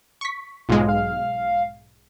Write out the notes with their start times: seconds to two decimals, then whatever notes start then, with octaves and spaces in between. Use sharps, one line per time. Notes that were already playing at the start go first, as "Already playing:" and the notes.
0.21 C#6 B6
0.69 B1 G#2 G#3 F4
0.88 F5